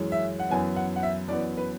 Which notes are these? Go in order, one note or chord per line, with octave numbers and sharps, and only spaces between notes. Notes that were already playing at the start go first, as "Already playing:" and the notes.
Already playing: F#2 E3 G#3 C#4
E5
F#5
F#2 E3 B3 G#5
F#5
F#5
E5
F#2 E3 B3 D5
B4